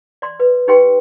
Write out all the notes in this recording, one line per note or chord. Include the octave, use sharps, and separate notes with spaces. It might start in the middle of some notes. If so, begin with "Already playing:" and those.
D5 C6
B4
D#4 G4 B4 G5 C6